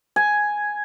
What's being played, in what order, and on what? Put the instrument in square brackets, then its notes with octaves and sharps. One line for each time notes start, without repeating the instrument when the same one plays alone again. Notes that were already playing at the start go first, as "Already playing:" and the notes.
[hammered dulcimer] G#5